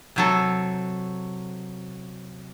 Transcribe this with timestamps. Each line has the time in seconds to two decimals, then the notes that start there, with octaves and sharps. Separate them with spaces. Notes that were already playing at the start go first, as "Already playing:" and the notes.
0.16 C3 F#3 A4